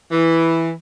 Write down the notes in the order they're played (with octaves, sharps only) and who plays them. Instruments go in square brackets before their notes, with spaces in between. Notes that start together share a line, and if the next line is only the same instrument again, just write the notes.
[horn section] E3